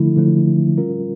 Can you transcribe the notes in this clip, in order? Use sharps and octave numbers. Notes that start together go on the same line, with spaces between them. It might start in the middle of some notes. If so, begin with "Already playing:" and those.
Already playing: D3 F3 A3 E4
D3 F3 A3 E4
G3 C#4 F4 A#4